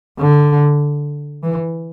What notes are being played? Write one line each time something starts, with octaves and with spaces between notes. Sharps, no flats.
D3
E3